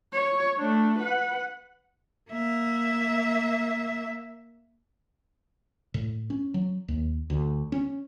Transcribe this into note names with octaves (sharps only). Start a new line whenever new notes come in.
C#5
A3 D4
B4 F#5
A#3 E5
A2
C#4
F#3
D#2
D2
C#4